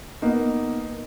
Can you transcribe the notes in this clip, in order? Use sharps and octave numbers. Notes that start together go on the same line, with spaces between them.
A#3 B3 D#4